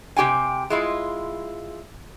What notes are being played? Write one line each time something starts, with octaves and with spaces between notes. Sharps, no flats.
C3 G4 G5 G#5
G#3 E4 F4